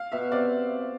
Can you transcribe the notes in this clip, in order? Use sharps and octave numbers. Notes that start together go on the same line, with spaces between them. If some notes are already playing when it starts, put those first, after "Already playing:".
Already playing: F5
B2 E5
C3 D5